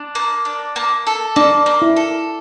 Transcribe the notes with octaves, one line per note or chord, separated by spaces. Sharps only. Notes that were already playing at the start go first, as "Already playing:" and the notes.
Already playing: D4
A#3
D4
A#3
A4
A#3 D4
A#3
E4
A4